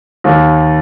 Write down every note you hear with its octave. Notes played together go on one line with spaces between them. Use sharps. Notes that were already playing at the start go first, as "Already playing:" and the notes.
D#2